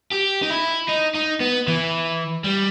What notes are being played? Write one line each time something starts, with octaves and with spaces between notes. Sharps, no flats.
G4
D#4
E4
D#4
D#4
B3
E3
G3